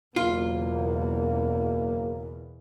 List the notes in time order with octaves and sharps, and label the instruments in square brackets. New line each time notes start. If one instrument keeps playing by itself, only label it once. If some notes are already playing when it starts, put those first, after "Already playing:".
[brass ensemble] F#1 A#3 [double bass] E2 B2 [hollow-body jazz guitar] F4